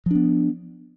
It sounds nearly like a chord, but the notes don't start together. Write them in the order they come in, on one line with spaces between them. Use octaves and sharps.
F3 D4 B3